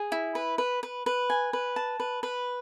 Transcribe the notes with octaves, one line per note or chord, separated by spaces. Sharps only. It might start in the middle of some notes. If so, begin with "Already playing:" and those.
Already playing: G#4
E4
B4
B4
B4
B4
G#5
B4
A5
B4
B4